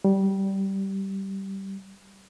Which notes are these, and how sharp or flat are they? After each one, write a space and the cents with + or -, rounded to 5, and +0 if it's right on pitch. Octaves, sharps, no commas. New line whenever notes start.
G3 -15